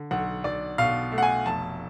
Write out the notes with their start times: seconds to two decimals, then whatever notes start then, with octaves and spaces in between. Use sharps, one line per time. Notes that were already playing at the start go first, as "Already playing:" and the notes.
Already playing: D3
0.11 B1 F#5
0.44 B1 D5
0.78 B2 F5
1.12 A3
1.18 F#5
1.22 G#5
1.46 F1 A5